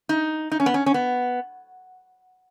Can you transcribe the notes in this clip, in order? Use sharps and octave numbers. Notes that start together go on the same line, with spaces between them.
D#4
D#4
C#4
B3
C#4
C#4
B3